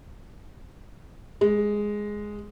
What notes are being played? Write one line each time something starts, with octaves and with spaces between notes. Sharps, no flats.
G#3